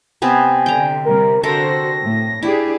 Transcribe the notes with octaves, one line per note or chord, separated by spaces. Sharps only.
C3 B3 C4 G#5
D3 G5 A#5
C3 G3 A#4
D3 F#4 A4 A#4 C5 E5 A#6
A2
D4 E4 G4 G#4